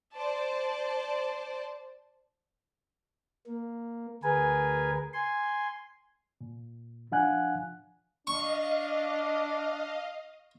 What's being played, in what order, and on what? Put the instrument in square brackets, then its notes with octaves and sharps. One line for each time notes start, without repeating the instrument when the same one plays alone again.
[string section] C5 D5 A5
[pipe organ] A#3
D2 G#4 A#4 B4 G#5
G#5 C6
[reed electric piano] A#2
F3 D4 F5 F#5 G#5 F#6
[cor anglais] D4 [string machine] D#5 F5 [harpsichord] C#6